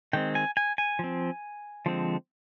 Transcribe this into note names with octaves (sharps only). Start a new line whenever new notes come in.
D#3 G#3 C4 G5
G#5
G#5
G#5
F3 C4
D3 F3 G#3 C4